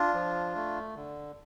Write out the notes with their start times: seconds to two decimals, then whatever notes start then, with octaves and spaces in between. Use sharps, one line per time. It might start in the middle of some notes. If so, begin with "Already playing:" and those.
Already playing: D4 F4
0.14 F3
0.56 A3
0.96 D3